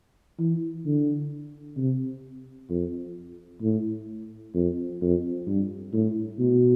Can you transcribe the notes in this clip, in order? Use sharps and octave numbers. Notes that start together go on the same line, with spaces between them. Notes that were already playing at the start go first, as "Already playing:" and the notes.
E3
D3
C3
F2
A2
F2
F2
G2
A2
B2